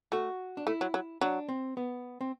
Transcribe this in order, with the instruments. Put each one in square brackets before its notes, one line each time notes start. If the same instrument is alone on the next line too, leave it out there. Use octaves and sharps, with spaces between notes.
[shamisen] A3 [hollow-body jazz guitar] F#4
[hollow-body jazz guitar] D4
[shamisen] A3 [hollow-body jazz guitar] E4
[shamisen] F#3
F#3
[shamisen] F#3 [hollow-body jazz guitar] D4
[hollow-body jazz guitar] C4
B3
C4